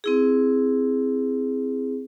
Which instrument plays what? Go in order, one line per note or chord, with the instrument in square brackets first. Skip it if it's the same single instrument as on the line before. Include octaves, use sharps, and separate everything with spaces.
[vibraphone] C4 E4 G#4